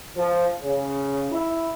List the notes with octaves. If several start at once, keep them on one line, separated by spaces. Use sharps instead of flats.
F3
C#3
E4